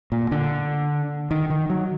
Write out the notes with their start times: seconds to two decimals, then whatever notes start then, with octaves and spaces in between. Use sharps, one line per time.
0.12 A#2
0.31 D3
1.31 D#3
1.50 D#3
1.70 F#3